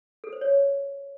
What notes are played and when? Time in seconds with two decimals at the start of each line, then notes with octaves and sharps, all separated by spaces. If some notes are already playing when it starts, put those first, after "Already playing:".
0.24 A4
0.33 C5
0.41 C#5